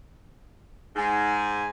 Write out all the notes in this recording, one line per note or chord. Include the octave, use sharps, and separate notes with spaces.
G#2 G#5